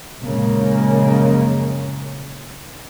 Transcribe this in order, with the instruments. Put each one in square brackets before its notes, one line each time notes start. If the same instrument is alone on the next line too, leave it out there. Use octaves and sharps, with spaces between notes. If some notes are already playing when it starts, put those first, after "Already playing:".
[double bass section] A#1 F#2 C#3 G#3 A#3